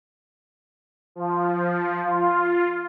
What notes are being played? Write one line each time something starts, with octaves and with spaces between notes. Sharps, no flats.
F3
F4